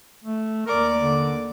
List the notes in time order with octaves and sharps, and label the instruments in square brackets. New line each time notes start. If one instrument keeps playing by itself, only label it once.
[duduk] A3
[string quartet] D#2 D5 D6 [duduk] A#4
[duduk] D3